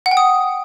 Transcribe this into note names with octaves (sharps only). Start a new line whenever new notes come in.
F#5
G5
D#6